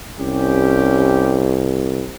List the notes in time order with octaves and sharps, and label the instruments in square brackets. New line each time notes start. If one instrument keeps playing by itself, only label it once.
[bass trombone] C2 [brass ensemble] C#4 G4